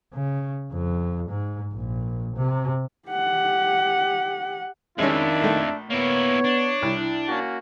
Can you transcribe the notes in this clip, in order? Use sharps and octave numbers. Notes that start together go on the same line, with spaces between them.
C#3
F2
G#2
A#1
C3
G4 F#5
F2 D#3 G#3 C#4 D4 E4 E5
A#1 A3
A#3 B3 E4 C#5
D4
C2 E4
A#3 C#4 F#4